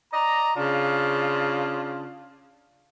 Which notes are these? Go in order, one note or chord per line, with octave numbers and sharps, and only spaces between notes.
D5 D#5 A#5
C#3 D4 F4